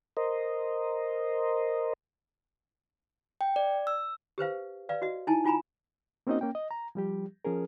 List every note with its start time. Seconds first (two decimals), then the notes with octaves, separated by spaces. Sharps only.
0.17 A#4 C5 D#5
3.41 G5
3.56 D5
3.87 E6
4.38 G4 B4 C5 F5
4.89 B4 D5 F5
5.02 F#4 D#5
5.27 D#4 E4 G#5 A5
5.44 D#4 F4 G#5 A#5 B5
6.27 A#3 C4 C#4 D#4 F#4 D#5
6.41 A#3 C#4 G5
6.55 D#5
6.71 A#5
6.95 F3 G3 G4
7.45 F3 C#4 G#4 A#4